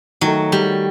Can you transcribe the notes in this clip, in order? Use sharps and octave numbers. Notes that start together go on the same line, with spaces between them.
D#3 F#3 A3 D#4
G3